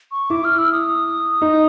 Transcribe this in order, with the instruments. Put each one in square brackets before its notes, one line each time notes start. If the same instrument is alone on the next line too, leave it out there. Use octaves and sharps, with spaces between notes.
[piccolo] C#6
[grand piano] E4 [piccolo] D6
[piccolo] F6
E6
D#6
[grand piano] D#4